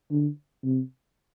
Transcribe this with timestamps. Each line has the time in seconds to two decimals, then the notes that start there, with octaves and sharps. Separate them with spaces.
0.11 D3
0.64 C3